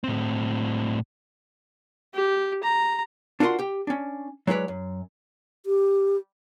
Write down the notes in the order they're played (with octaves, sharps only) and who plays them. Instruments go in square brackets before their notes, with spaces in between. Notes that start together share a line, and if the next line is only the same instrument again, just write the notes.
[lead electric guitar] A2 C4
[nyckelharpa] G4
A#5
[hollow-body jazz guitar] D4 F4 F#4 A#4 F#5 C6
G4 G5
C#4 D4
F#3 G#3 E4 B4 C#5 D5
F#2
[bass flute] G4